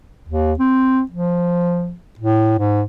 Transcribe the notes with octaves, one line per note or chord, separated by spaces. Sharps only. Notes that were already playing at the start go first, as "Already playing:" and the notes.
D#2
C4
F3
A2
G#2